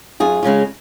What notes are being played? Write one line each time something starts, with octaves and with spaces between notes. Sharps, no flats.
F#2 F4 G#4
C#3 G#3 C#4 F4